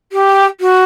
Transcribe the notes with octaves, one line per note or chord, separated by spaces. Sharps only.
G4
F#4